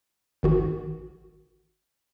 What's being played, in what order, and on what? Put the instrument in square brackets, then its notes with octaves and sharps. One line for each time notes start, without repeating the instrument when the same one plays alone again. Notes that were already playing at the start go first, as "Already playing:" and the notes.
[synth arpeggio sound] G#1 D#3 F#4